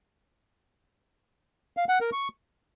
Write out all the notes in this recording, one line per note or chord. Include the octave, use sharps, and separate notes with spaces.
F5
F#5
A#4
C#6